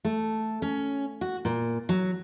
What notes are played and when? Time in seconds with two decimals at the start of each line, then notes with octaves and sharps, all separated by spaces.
0.05 A3
0.62 C#4
1.21 F#4
1.45 A#2
1.89 F#3